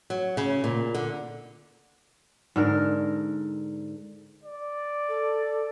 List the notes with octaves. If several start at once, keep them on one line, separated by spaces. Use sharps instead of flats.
F#3
C#3
A#2
D3
G#2 D3 A#4
D5
A4